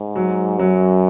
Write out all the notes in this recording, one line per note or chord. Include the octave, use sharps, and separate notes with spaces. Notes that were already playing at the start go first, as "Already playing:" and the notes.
Already playing: G#2
F#3
F#2 F#3